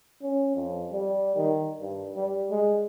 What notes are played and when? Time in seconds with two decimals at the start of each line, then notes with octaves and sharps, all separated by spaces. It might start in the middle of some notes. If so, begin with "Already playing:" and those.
0.22 C#4
0.55 F2
0.91 G3
1.36 D#3
1.80 G2
2.16 G3
2.50 G#3